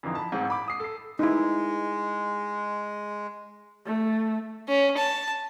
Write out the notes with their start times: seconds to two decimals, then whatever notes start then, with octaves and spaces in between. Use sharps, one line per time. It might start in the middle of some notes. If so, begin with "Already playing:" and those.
0.03 F2 D3 E3 F3 D#4
0.15 A5 B5
0.32 A1 G#2 C4
0.50 B5 D6
0.68 D#6 C7
0.80 A4 C7
1.19 G#3 D#4 E4
3.86 A3
4.68 C#4
4.97 A5